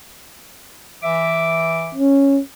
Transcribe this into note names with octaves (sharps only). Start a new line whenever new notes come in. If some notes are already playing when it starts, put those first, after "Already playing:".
E3 E5 D6
C#4